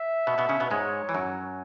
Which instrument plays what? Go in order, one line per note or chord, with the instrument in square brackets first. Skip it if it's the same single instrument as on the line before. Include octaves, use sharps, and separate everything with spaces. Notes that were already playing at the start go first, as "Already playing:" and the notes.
Already playing: [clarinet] E5
[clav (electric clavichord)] B2 B3
B2 B3
C#3 C#4
B2 B3
[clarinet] B4
[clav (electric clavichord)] G#2 G#3 [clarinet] C#5
[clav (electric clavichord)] E3
F#2 F#3